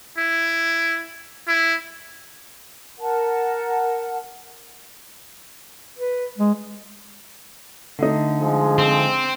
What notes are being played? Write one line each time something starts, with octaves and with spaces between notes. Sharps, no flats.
E4
E4
A#4 F#5 A5
B4
G#3
D3 A3 D#4
F3 G#3 G#4
C4